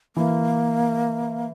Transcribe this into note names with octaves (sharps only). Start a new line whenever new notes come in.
E3 A#3